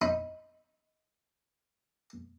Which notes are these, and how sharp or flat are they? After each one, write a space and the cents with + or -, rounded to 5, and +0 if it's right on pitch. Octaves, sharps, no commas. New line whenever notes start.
D#4 +10 B5 +0